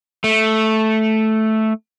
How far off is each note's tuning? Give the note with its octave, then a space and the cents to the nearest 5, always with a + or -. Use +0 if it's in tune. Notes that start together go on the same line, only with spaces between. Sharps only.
A3 -5